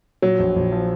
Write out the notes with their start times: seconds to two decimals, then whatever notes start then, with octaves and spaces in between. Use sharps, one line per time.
0.22 A#2 F#3
0.39 A#1
0.56 A#1
0.72 F3